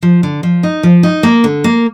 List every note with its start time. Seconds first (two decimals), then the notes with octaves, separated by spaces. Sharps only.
0.03 F3
0.23 D3
0.43 F3
0.63 D#4
0.83 F3
1.03 D#4
1.23 A#3
1.44 D3
1.64 A#3